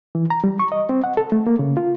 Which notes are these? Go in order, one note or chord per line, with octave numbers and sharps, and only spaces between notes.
E3
A#5
G3
C#6
D#5
C4
F#5
A4
A3
A#3
C#3
F4